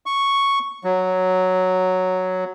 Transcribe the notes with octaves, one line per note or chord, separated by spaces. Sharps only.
C#6
F#3